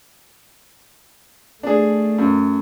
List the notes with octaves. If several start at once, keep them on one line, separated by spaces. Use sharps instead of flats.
A3 D4 G#4
F#2